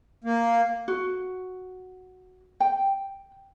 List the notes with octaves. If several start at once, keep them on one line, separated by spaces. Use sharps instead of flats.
A#3
F#4
G5